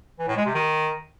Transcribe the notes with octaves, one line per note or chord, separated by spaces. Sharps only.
E3
A2
G#3
C3
D#3